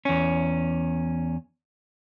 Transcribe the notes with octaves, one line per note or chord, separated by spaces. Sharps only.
E2 C#4